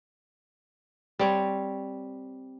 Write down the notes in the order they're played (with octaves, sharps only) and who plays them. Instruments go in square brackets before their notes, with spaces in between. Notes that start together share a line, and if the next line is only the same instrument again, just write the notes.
[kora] G3 C4 C#5